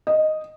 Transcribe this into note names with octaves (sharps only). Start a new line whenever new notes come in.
D#5